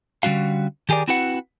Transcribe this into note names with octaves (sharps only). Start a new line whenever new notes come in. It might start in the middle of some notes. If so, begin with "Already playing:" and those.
D3 G3 C#4 F#4 F5
D#3 G4 G#4 A#4 D5
C4 E4 F#4 B4 F#5